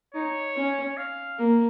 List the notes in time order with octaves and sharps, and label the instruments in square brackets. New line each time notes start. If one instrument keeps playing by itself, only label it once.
[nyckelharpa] D#4 [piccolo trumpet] C#5
[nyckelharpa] C#4
[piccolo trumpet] F5
[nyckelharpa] A#3